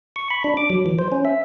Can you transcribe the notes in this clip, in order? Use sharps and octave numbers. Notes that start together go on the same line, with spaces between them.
C#6
B5
D4
D6
F#3
E3
C5
C#4
E5